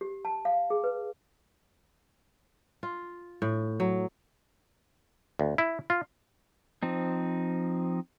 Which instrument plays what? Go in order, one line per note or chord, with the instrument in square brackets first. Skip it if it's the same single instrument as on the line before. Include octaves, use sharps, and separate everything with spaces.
[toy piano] G4
A5
F5
G#4
B4
[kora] F4
A2
F#3
[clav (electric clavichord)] D2
E4
F4
[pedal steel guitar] F3 C4 D#4